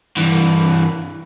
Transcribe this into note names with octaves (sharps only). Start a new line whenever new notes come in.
G2 E3